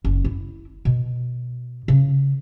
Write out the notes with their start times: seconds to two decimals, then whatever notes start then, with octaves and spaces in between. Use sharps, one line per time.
0.05 F#1
0.24 E4
0.85 B2
1.88 C#3